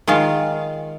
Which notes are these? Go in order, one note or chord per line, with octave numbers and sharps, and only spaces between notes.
D#3 G#3 F4 F5